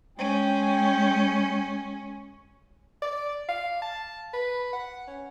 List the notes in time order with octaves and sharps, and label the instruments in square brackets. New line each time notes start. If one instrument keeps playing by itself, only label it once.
[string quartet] G#3 C#4 [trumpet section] G5
[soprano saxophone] D5
F5
A5
B4
F#5
C#4